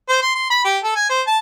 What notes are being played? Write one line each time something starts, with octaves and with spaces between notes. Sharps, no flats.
C5
C6
C6
B5
G4
A4
G#5
C5
A5